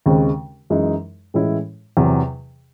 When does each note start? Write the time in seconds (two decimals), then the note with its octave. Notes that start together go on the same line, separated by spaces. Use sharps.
0.06 D#2 C#3 G#3 C4
0.70 F#2 E3 G#3 D#4
1.34 A2 E3 G#3 C#4 E4
1.97 E2 C3 F#3